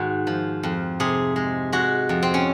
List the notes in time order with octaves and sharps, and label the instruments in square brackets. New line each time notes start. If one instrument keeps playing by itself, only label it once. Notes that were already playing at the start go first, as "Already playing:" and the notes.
Already playing: [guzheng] G#2 D#3 F#4
F3
F2
C3 G#4
G#3
G#3 F#4
F2
C4
C#4